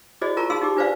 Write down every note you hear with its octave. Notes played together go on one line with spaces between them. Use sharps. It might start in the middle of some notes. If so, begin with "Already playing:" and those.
E4 F#4 G#4 C5 D5 D#5
E4 F4 A#4 A5 A#5 C#6
D#4 F#4 G#4 F5 C6 E6
D#4 G4 D6
D4 F4 B4 C5 D5 F5